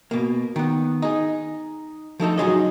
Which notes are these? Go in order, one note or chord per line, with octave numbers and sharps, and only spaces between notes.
B2 A#3
D#3 B3
D#4 G#4
F3 A3 D#4 A4
F#3 D#4 F4 G#4 C#5 D#5